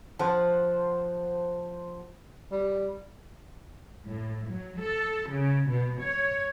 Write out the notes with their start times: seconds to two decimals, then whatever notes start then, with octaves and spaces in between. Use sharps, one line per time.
0.19 F3 C5 F#5 A5
2.52 G3
4.07 A2
4.49 F#3
4.79 A4
5.29 C#3
5.68 B2
6.01 C#5